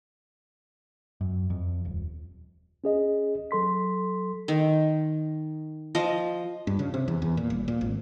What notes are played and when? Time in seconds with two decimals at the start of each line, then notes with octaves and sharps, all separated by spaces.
1.21 F#2
1.50 F2
1.85 D#1
2.84 C#4 G#4 D#5
3.51 F#3 A4 C6 B6
4.48 D#3
5.95 F3 D#5
6.67 G2
6.79 C#3
6.94 C3
7.08 E2
7.22 E2
7.37 A#2
7.50 D#1
7.68 A#2
7.81 G#1